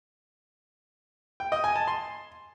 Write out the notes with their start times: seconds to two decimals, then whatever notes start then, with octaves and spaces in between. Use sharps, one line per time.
1.40 G5
1.52 D#5
1.64 G#5
1.76 A5
1.88 C6